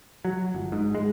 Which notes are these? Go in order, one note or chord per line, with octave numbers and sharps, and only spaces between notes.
F#3
G1
G#2
G#3